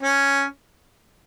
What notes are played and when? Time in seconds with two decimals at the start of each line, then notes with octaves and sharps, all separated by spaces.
0.02 C#4